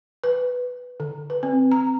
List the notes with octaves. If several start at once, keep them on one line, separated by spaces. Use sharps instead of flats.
B4
D3
B4
C4
A#5